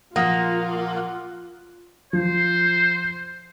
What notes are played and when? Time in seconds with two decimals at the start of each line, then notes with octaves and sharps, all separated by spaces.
0.16 A#2 F3 A#3 F4 F#5 D#6 F#6
2.13 F3 C5